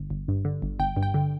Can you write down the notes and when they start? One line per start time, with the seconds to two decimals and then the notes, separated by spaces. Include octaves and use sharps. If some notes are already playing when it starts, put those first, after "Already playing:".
Already playing: G1
0.10 G1
0.28 G2
0.45 D3
0.62 G1
0.79 G1 G5
0.96 G2
1.03 G5
1.14 D3